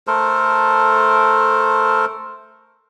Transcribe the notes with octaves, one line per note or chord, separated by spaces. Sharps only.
A3 A4 A#4 C5